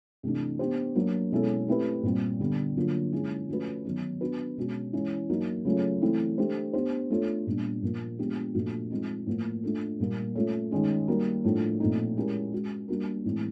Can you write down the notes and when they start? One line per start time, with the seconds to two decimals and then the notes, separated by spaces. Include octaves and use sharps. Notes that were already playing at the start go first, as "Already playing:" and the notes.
0.23 C3 E3 A3 D4
0.59 B3 D4 G4 C5
0.95 F#3 A#3 D4
1.32 B2 G#3 C#4 E4 A4
1.68 A3 C4 E4 G4 B4
2.03 A#2 G3 C4
2.40 D3 G3 B3
2.76 D3 F#3 A#3 D4 F4
3.13 G#3 C#4 E4 G#4
3.49 F3 A3 C#4 F#4 B4
3.85 D#3 F#3 B3 D#4
4.21 B3 D4 F#4 B4
4.57 B2 G#3 C#4 F#4
4.93 E3 G#3 C#4 E4
5.29 F#3 A#3 D#4 F#4
5.65 C#3 F#3 A3 C#4 F4
6.02 E3 A3 C4 E4
6.38 A3 D4 G4 C5
6.73 B3 D4 G4 C5
7.10 A3 D4 F4 A4 C#5
7.47 A#2 G3 B3 D4
7.83 A#2 F3 A#3
8.19 F3 G#3 B3 D4 G4
8.54 A#2 F3 A3 D4 F#4
8.90 F3 G#3 C4 D#4
9.26 A2 F3 A#3
9.63 A3 D4 F4 A4
10.00 A#2 G3 A#3
10.35 A3 C#4 F4 A4 C#5
10.71 D#3 G#3 C#4
11.08 G3 A#3 D#4 F#4 A#4
11.44 A2 F3 A3 D4
11.80 A#2 F3 A3 C4 D#4
12.17 G#3 C#4 E4 G4 A#4
12.52 G#3 C#4 F#4
12.88 G3 A#3 D4 F#4 A#4
13.25 A2 E3 G#3 C4